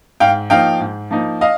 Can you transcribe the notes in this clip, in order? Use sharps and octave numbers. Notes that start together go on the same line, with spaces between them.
G#2 F5 G5
F3 A#3 D#4 F5 G5
G#2
F3 A#3 D#4
D#5 F5